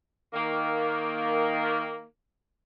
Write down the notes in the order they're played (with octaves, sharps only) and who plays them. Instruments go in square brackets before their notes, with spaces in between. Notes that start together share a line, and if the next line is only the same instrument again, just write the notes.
[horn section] D#3 A#3